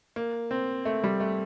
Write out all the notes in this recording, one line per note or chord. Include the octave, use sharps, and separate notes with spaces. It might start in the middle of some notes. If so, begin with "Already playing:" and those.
A#3
C4
A3
G3
A3